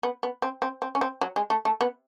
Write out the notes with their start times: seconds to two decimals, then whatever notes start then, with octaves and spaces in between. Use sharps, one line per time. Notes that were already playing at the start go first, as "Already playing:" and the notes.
0.03 B3
0.23 B3
0.42 C4
0.62 C4
0.82 C4
0.95 C#4
1.01 C4
1.21 F#3
1.36 G#3
1.50 A3
1.65 A3
1.81 B3